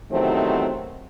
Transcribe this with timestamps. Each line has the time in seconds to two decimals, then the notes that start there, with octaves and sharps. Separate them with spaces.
0.11 E2 C3 D#3 F#3 A3 C4